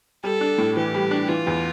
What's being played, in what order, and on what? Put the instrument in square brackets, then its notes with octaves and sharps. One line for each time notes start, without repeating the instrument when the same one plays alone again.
[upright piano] G3 [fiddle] A4
[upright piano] D4
A2
[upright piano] E3 [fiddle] G4
[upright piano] G3
D4
[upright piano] E3 [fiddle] F4
[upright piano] E2